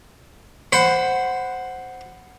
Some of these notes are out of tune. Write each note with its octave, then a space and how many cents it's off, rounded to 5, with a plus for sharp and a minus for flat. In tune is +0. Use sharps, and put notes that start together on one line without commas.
C5 +0 F#5 +0 B5 +20